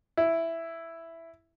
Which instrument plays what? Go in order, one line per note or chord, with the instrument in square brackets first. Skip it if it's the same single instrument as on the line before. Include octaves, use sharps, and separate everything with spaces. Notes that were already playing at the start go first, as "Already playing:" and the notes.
[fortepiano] E4